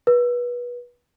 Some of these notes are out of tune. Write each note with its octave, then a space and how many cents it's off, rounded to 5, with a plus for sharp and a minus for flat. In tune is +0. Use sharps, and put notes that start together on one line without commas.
B4 -25